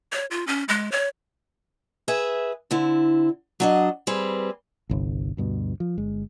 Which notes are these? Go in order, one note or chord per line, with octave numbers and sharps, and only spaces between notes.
C#5
F4
C#4
G#3
C#5
G#4 B4 E5
D3 C4 E4
F#3 D4 D#5
G3 C4 G#4 B4
G1 C2
D2 G2 B2
F3
G1 G#3